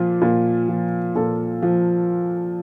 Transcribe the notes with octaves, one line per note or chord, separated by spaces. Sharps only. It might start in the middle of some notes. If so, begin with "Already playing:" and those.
Already playing: A#2 F3 F4
A#2
F3
A#2 A4
F3